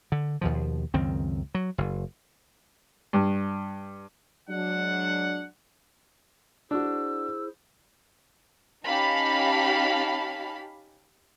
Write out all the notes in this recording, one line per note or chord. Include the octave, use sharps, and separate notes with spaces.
D3
D#2 B2 F3
C#2 F#2 D#3 C4
F#3
F#1
G2
F#3 G#3 D4 F#5
D4 E4 F#4 G#4 C5 E6
C#4 D#4 G4 F5 A5 B5